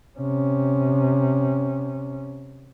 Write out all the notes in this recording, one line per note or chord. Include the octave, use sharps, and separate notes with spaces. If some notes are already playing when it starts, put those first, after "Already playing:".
C3 C#4